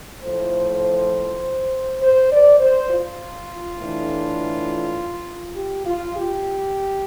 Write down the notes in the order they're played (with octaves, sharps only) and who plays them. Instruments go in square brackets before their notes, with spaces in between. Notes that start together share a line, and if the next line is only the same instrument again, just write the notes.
[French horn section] A2 F3 A3 C5
C5
D5
C5
F4
A2 E3 A3 D4
G4
F4
G4